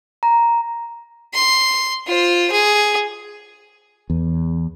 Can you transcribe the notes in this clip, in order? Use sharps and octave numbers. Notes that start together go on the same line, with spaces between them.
A#5
C6
F4 C5
G#4
E2